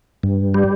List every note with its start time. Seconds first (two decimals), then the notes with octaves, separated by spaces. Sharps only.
0.23 G2
0.54 G3